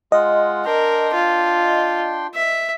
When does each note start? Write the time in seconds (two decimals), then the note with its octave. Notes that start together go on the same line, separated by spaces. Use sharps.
0.12 G#3 F4 D#5 F#5
0.65 D4 A#4 G5 C6
1.13 F4
2.34 E5